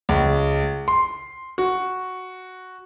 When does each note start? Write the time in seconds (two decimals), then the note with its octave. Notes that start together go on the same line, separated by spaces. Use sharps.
0.09 C#2
0.88 C6
1.58 F#4